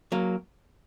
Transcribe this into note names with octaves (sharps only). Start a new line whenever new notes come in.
F#3 A#3